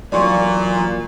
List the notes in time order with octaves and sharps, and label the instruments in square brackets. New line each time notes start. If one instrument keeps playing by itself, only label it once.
[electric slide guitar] G2 E3 F#3 [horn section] A#2 [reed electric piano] D5 C6 C#6